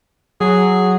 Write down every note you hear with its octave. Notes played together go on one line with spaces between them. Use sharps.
F#3 G#4